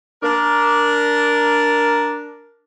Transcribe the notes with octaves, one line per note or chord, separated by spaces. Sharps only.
D4 A#4